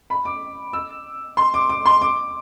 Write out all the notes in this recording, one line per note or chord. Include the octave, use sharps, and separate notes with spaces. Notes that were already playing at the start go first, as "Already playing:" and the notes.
B5
D6
E6
C6
D6
D6
C6
D6